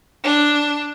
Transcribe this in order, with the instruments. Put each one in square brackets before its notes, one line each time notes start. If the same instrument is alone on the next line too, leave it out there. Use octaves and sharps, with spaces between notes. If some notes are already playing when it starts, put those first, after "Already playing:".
[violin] D4